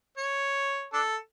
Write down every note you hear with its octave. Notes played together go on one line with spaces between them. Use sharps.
C#5
D4 A4